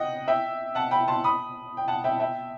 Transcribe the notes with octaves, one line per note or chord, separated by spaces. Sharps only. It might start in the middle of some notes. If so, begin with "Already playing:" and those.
Already playing: D#5 F#5 G5
E5 G5
F#5 A5
G5 B5
A5 C6
B5 D#6
G5
F#5 A5
E5 G5
E5 G5